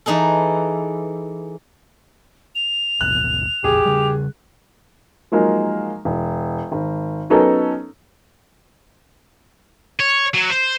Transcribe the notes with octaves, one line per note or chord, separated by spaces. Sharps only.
E3 D#4 G#4 A4
F7
A1 D#2 B2 F#6
A1 E2 A#2 G4 G#4
C#3 G3
F3 F#3 G#3 A#3 D#4
E1
G#1
F#3 B3 C#4 D#4 A4 A#4
C#5
F#3
C5